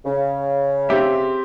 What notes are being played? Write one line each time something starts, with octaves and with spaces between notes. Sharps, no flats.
C#3
C4 G4 E5